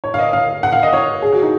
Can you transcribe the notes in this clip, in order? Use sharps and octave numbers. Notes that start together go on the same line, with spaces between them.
C#5
F5
D#5
F5
F#5
F5
D#5
C#5
G#4
F#4
D#4